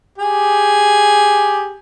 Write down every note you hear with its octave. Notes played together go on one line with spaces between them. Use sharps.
G4 G#4